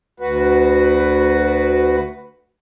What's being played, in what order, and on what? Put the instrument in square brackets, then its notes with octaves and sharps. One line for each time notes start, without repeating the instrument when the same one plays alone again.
[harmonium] D2 F#4 B4